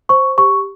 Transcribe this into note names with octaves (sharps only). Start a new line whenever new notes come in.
C5 C#6
G4 C#6